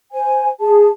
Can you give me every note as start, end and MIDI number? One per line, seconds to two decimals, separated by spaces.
0.12 0.49 72
0.12 0.49 80
0.60 0.88 68
0.60 0.88 81